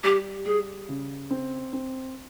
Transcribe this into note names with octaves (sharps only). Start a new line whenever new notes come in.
G3 G4
G3 G#4
C#3
C4
C4